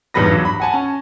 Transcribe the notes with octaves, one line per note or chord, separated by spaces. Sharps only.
D#1 E2 G#2 G3 B4 A#6
G2 F#3
B5
F#5 G#5 A5
C#4